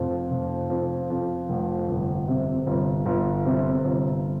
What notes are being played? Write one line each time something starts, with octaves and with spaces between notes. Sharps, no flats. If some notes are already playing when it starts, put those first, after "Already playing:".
Already playing: F1 F2
F1
F2
F2
F1
G1
C3
G1
G1
C3
G1